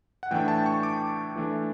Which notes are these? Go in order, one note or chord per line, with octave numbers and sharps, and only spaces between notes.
F#5
A2 E3 A3 D4 G5
A5
C#6
D6
E3 A3 D4